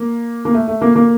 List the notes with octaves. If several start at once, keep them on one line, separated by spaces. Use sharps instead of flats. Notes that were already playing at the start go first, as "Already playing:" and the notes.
Already playing: A#3
A#3
A3
A3
A#3
A#3